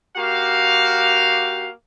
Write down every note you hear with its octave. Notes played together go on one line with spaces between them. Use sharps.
A#3 F#4 G4 F5